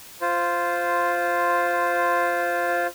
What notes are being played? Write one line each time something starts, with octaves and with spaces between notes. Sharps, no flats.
F4 C5